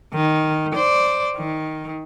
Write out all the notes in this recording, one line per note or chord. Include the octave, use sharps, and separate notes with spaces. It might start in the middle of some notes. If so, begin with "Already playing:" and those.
D#3
C5 D5
D#3